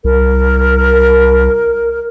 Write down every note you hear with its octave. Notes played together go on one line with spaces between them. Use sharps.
C2 A#4